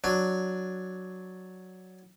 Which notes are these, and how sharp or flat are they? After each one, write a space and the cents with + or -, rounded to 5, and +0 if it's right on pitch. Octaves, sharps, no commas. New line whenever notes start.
F#3 +0 D4 +0